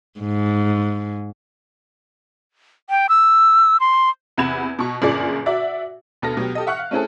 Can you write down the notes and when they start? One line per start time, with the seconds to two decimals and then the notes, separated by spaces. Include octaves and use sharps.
0.20 G#2
2.90 G5
3.09 E6
3.80 C6
4.38 E2 C3 F#5 B5 G#6 E7
4.79 B2 C#6
5.02 G1 F#2 A#2 G#4 D5
5.46 F#4 D5 E5
6.22 D2 B2 A4 F6 A#6
6.37 B2 F#3 G4
6.55 G4 A4 D#5
6.67 E5 F#5 C#6 F6 F#6
6.79 F5
6.91 A3 C4 C#4 E4 G#4 A4